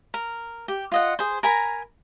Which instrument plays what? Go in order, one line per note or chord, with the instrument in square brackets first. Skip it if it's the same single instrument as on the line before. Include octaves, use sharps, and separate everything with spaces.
[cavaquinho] A#4
G4
F4 D#5 F#5
G#4 C5
A#4 G#5 A#5 B5